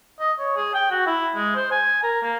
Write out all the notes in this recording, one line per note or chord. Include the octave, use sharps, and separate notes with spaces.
D#5
C#5
G#4
G5
F#4
E4
G#3
C5
G#5
A#4
A#3